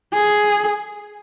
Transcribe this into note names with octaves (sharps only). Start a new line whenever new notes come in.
G#4